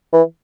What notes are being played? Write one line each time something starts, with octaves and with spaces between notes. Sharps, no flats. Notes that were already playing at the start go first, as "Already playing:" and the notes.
E3